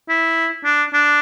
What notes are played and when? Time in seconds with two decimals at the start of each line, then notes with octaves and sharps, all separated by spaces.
0.09 E4
0.65 D4
0.93 D4